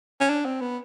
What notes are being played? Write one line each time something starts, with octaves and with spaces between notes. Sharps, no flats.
C#4
D4
C4
B3